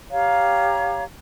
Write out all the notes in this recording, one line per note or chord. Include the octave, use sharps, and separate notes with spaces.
G4 C#5 F5 A#5